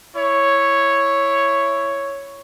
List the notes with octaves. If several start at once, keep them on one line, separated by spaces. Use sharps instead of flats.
E4 C#5